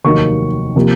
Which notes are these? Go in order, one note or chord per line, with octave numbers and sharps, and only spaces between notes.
F1 D#2 D#3 F#3 C#6
C3 F3 A#3